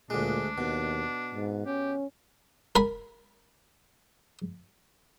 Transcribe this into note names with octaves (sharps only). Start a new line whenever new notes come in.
D2 A#2 G#3 D4
D#2 B2
G#2
C#4 G4
A#4 G#5 B5